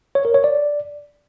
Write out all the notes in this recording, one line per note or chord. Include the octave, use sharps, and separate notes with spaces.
C#5
A#4
C#5
D5